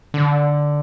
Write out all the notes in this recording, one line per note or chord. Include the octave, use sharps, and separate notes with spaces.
D3